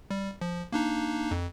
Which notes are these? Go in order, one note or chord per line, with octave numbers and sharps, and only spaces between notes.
G3
F3
A#3 D4 D#4
F2